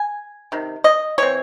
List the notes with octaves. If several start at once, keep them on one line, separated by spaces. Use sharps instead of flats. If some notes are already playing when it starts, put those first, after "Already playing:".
Already playing: G#5
C3 D#3
D#5
E3 C4 C#5